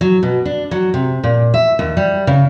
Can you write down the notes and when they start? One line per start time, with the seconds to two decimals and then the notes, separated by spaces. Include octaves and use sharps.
0.01 F#3
0.23 B2
0.45 D4
0.71 F#3
0.94 C3
1.24 A#2
1.54 E5
1.79 D#2
1.97 G3
2.27 C#3